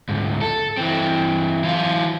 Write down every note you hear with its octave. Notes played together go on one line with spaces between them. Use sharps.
D2 G#2
A4
E3 C4
E3 F4